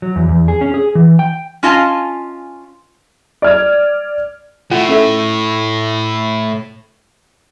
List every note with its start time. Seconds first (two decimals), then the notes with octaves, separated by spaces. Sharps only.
0.02 F#3
0.16 E2
0.29 E2
0.48 G#4
0.61 C#4
0.74 G#4
0.95 E3
1.19 G5
1.63 C#4 F4 D#5 F5 G#5 A5
3.42 D5 F6 G#6
4.71 A2 F4 F#5 G5
4.89 C#4 A4 E5